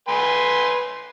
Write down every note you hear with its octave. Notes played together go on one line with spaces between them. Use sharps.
B4 G#5 C6